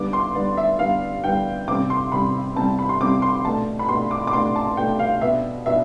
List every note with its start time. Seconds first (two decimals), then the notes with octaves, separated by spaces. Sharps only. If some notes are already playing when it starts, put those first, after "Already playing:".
Already playing: D3 G3 B3 D6
0.13 C6
0.35 D3 G3 B3 D5
0.57 E5
0.79 D3 G3 B3 F5
1.24 D3 G3 B3 G5
1.68 C3 G3 C4 D6
1.90 C6
2.12 C3 G3 C4 B5
2.56 C3 G3 C4 A5
2.79 B5
2.89 C6
3.00 C3 G3 C4 D6
3.22 C6
3.45 B2 A3 D4 A5
3.79 B5
3.89 B2 A3 D4 C6
4.11 D6
4.27 D6
4.33 B2 A3 D4 C6
4.56 A5
4.77 B2 A3 D4 G5
4.99 F5
5.21 B2 B3 D4 E5
5.66 B2 B3 D4 E5